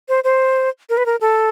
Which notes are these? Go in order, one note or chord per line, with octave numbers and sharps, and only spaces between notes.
C5
C5
A#4
B4
A#4
A4